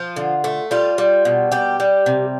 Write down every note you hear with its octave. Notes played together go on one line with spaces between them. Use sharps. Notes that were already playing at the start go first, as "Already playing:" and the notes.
Already playing: F3 F4
D3
A3
G3 F4
G3
B2
G3 G4
G3
C3